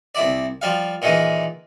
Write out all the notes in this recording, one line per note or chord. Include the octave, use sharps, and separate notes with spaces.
C2 E4 D5
F3 G3 F5
A#2 D#3 E3 G#3